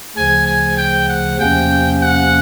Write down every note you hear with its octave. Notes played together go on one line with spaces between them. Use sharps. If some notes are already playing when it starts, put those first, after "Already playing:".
D2 C#3 F3 G#5
G#5
G5
F#5
E2 C3 F3 A#3 C#4 G5
F#5